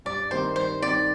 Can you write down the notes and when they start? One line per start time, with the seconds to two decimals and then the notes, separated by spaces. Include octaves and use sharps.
0.05 G2 D5
0.31 D#3 G3 C4 D#4 C5
0.56 G2 C5
0.82 D#3 G3 C4 D#4 D5